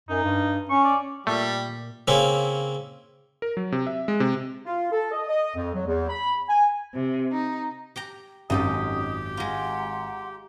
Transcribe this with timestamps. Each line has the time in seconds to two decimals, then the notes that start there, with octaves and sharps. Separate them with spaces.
0.09 F#2 D#4
0.24 G2
0.70 C#4 C#6
0.84 D5
1.27 A#2 G3 A3
2.08 C#3 A#3 C4 C#4 E4
3.42 A#4
3.57 F#3
3.72 C3
3.87 E5
4.08 G#3
4.20 C3
4.65 F4
4.92 A4
5.12 D#5
5.28 D#5
5.56 F2
5.74 F#3
5.86 E2
6.09 B5
6.49 G#5
6.94 C3
7.32 D#4
7.96 G4 G5 A#5
8.50 G#1 F#2 C#4 D#4 G4 A4 D#5 D#6
9.37 G#3 F4 F#5 A#5 C6